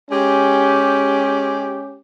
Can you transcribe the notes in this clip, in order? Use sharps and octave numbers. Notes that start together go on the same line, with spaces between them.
G#3 C#4 G4